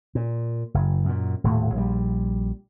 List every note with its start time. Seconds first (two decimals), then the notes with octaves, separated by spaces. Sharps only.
0.15 A#2
0.74 F#1
1.05 F#2 A#2
1.44 D#1 A2
1.75 A#1 G3